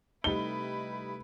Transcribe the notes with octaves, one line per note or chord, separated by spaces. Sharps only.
C3 G3 A3 D#4 E4 B4 G7